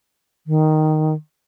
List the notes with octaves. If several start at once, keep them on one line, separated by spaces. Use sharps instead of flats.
D#3